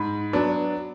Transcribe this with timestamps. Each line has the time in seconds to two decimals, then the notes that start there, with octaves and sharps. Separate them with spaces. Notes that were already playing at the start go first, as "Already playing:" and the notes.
Already playing: G#2 B5
0.33 F#3 B3 D4